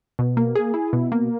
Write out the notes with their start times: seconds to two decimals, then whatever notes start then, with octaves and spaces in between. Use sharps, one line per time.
0.19 B2
0.37 A#3
0.55 G#4
0.74 E4
0.93 B2
1.12 A#3